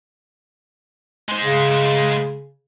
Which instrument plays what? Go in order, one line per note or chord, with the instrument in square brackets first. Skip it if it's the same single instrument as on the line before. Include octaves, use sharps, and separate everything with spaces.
[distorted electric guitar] G#3 C5
[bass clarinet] C#3